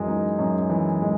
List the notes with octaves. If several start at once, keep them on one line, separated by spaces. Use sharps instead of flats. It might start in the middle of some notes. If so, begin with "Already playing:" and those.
Already playing: F#2 E3 G#3
D#4
F#2
E3
G#3